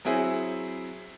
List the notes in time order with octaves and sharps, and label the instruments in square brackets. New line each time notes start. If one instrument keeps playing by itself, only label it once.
[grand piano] F#3 C4 E4 G#4